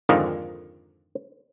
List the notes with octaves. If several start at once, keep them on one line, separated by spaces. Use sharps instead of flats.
F2 G#2 D3 D#3 F3